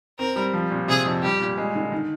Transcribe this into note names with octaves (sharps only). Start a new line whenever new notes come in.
C4 A#4
G3
F3
A#2
C3 G#4
F2
G3 G4
A#2
G#3
D3
D#3